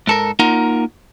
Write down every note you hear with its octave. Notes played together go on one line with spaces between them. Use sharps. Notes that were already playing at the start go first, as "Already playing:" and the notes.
G#2 A4 A#4
A#3 D#4 F4 A#4 F#5 A#5